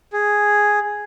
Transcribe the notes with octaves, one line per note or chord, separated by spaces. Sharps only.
G#4